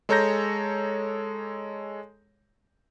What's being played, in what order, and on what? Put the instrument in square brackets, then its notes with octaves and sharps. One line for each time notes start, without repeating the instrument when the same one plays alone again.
[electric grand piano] G#3 A4 C#5 A#5 G6 A#6